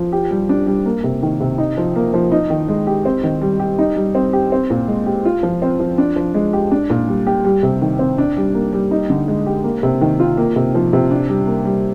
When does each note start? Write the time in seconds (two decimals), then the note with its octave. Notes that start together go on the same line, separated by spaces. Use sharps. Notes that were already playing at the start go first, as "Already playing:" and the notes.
Already playing: F3
0.12 G4
0.31 G3
0.49 D4
0.67 G3
0.86 A#3
1.04 C3
1.23 D#3
1.40 C3
1.58 D#4
1.77 F3
1.96 A#3
2.14 F3
2.32 D#4
2.50 D#3
2.68 G#3
2.87 G4
3.05 C4
3.23 D#3
3.42 G3
3.59 G4
3.79 D#4
3.96 G3
4.15 C4
4.33 G4
4.52 C4
4.70 A#2
4.88 G#3
5.06 G4
5.25 F4
5.43 F3
5.62 C4
5.80 F3
5.98 D4
6.16 F3
6.34 G#3
6.53 G4
6.72 D4
6.90 A#2
7.08 G3
7.27 G4
7.45 G3
7.63 C3
7.82 D#3
7.99 C4
8.18 D4
8.37 G3
8.54 A#3
8.73 G3
8.91 D#4
9.10 D3
9.28 G#3
9.46 G4
9.64 A#3
9.83 C3
10.01 D#3
10.20 F4
10.37 A#3
10.56 C3
10.75 F3
10.93 C3
11.11 D4
11.29 G3
11.47 A#3
11.65 G3